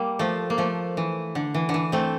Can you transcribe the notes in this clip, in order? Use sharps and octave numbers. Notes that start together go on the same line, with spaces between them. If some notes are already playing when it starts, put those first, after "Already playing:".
Already playing: G3 A#3
F3 A3
A#3
F3 A3
E3
D3
E3
D3
E3
A3 C4